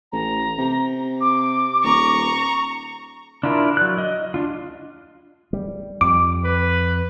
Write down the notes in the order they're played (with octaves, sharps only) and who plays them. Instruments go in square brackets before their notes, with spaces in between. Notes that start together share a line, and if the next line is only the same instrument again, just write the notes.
[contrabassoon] A1 [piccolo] A#5
[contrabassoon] C3
[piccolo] D6
[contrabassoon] D#1 [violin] A#5 C#6
[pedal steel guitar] D4 E4 F4 A#4
F#3 D5 F#6
D#5
D4 F4
[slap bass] G3
[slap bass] F2 [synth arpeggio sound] D6
[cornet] B4